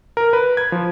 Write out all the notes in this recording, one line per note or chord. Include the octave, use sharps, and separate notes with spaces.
A#4
B4
G#6
F3